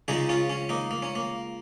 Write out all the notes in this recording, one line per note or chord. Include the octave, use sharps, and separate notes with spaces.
C#2 C#3 G#3 D#4 G#4
C#4 F4
C#4
A#3 D#4
A#3
C#4
A#3